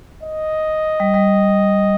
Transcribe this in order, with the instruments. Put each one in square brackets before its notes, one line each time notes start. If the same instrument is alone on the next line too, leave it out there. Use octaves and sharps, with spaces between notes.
[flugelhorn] D#5
[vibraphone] G3
G3